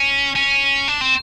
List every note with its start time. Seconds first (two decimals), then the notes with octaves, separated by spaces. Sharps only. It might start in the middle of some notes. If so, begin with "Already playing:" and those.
Already playing: C#4
0.35 C#4
0.88 D4
1.01 C4